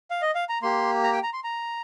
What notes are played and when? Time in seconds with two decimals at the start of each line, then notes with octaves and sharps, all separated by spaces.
0.11 F5
0.22 D#5
0.35 F5
0.49 A#5
0.62 A#3 G4 C6
1.03 A#5
1.13 G5
1.23 A#5
1.33 C6
1.44 A#5